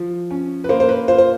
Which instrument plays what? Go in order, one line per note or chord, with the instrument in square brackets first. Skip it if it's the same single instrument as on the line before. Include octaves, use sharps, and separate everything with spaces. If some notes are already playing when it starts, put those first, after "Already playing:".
Already playing: [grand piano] F3
C#4
B4
A#3 C5
C5
B4
F4 C5
C5